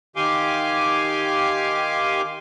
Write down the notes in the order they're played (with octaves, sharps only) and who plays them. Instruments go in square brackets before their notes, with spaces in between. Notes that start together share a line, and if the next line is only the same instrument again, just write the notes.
[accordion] D#3 G4 F5 G#5 C6 D6